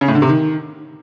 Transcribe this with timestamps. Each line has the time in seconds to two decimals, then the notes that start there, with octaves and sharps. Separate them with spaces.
0.01 C#3
0.08 A2
0.15 D3
0.22 C3
0.29 D#3